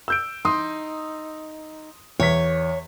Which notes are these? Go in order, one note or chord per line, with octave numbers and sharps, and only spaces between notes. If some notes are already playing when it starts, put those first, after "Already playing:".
E6 G6 D7
D#4 C6 D#6
E2 C#5 B6